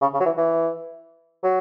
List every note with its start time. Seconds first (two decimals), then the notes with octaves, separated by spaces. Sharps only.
0.01 C#3
0.14 C#3
0.20 F#3
0.25 E3
0.37 E3
1.43 F#3